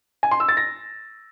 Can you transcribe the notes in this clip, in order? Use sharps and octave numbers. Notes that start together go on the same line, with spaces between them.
G#5
C6
E6
A6
A#6